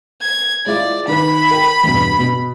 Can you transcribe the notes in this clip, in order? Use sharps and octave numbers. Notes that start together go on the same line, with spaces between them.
G#6
G#3 E4 F4 D5
D#3 B4 B5
A#4 G5
E2 G2 B2
B2